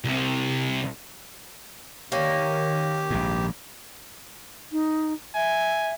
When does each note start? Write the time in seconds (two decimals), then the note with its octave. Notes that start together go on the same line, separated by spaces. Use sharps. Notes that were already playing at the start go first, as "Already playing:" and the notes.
0.04 C2 C3
2.12 D#3 A#3 C#4 G4
3.11 A#1 G#2
4.72 D#4
5.35 E5 G#5